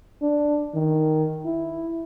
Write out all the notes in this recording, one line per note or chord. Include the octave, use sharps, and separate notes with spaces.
D4
D#3
E4